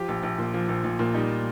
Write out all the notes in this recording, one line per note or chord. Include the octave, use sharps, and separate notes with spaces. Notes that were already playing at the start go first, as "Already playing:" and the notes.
Already playing: F3 G4
A#1
A#1
A#2
F3
A#1
A#1
A#2
G3 D#4